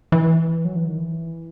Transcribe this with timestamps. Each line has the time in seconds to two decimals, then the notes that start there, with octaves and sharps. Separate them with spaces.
0.12 E3
0.65 F#3
0.76 E3
0.87 D#3
0.98 E3